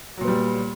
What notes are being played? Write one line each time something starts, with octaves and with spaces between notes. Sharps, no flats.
A#2 F#3 G3 B3